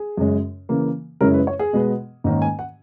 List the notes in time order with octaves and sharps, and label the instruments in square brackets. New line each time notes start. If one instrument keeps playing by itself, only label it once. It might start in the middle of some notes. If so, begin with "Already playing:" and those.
Already playing: [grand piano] G#4
F#2 C#3 G#3 C#4
C#3 E3 A#3
F#2 C#3 G#3 C#4 E4 A#4
B4
C#5
G#4
B2 G#3 B3
G#2 D#3 A#3 C#4
G#5
F#5